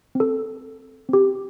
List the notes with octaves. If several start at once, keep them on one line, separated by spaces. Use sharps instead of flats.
C4 A4
C4 G4